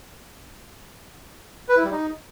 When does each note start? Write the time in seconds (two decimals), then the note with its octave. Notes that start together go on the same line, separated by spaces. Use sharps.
1.69 B4
1.77 E4
1.84 G3
1.92 D#4